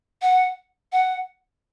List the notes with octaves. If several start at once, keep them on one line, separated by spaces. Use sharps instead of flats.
F#5
F#5